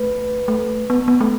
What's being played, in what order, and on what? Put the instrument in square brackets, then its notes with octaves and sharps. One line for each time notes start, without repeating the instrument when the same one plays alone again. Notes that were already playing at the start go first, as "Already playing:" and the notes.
Already playing: [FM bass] A3 [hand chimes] B4
[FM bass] A3
B3
B3
A3